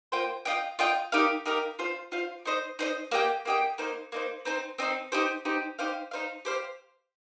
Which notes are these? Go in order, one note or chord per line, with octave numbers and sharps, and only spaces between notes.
A#3 F4 C5 G5
F4 D#5 G5
F4 D#5 G5
D#4 G4 A#4 F5
D#4 G4 A#4 F5
F4 C5 F5
F4 C5 F5
D#4 C5 D#5
D#4 C5 D#5
A#3 G4 D#5 G5
A#3 G4 D#5 G5
A#3 D#4 C5
A#3 D#4 C5
C4 D#4 C5
C4 D#4 C5
D#4 G4 C5
D#4 G4 C5
D#4 G4 C5 F5
D#4 G4 C5 F5
G4 C5 F5